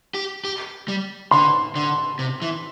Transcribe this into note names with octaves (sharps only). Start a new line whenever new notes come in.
G4
G4
G3
D3 C6
D3
C3
E3